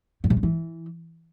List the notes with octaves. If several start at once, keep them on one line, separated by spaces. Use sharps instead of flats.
G2
C3
C#3
E3